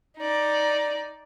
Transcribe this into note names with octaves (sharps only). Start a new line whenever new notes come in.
D#4 D5